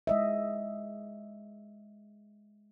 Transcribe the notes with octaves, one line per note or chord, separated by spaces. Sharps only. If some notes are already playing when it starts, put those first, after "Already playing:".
G#3 D#5 E5